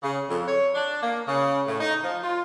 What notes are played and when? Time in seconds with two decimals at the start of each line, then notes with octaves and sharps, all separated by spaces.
0.03 C#3
0.29 F2
0.47 C#5
0.74 D4
1.02 A#3
1.27 C#3
1.67 A2
1.81 D#4
2.03 F3
2.23 F4